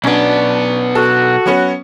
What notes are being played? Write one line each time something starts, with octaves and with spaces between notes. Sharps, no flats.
B1 B3 C#4 D4
F#4 A4
F#3 B3 C#4